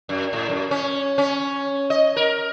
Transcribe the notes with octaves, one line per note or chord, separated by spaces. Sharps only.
F#2
A2
F#2
C#4
C#4
D#5
A#4